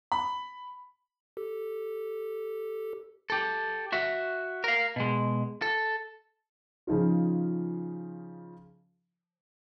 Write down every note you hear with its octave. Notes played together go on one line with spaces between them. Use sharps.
B5
G4 A4
G4 A4
F#4 E5
A#4 F5
B2 G#3
A4
C#3 F3 D#4 F4